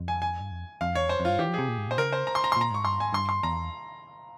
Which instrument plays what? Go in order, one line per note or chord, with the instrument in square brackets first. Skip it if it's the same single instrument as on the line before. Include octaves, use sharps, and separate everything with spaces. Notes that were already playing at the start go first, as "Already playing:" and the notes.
Already playing: [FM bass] F2
[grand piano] G#5
G#5
[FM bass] G2
F2
[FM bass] F2 [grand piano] F5
[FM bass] E2 [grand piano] C#5
[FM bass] F2 [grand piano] C5
[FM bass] F2
[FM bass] G2 [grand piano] F4
[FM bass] E3 [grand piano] G4
[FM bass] F3
[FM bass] C3 [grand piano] G#4
[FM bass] A#2
G#2
[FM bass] A#2 [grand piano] C5
[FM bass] C#3 [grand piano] A#4
[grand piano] C5
A#5
C6
A#5
C6
[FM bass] A#2 [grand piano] A#5
[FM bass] G#2 [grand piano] C#6
[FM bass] G2 [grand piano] C6
[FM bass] G#2 [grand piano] G#5
[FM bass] G2 [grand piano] C6
[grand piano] C6
[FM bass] E2 [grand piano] A#5